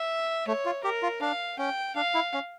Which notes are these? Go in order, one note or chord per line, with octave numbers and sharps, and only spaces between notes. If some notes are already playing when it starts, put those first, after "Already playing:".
Already playing: E5
A3 C#5
F4
G4 A#4
F4
D4 F5
C#4 G5
D4 F5
E4
C#4